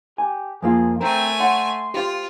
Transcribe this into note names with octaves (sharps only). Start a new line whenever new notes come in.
G4 G#5
F2 A#3 F4 G#4
A3 C4 A#4 G#5
C#5 F#5 C6
F4 G4 C5